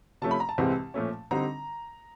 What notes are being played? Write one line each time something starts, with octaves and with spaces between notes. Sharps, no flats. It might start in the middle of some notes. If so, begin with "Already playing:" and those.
C3 F3 A3 C#4 A5
B5
A#5
A5
C2 C3 E3 G#3 C4
A#2 F3 A3 C#4
D3 G3 C4 D#4 A#5